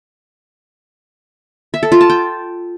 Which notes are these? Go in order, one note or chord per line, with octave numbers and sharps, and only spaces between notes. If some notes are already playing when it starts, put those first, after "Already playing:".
E5
A4
F4
A5
G5